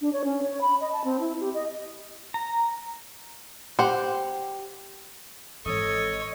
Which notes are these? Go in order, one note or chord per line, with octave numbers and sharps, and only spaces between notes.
D4
C#5
C#4
C#5
B5
D#5
A5
C4
E4
G4
D#5
A#5
G4 C5 F#5
G#1 E3 A4 C#5 D#5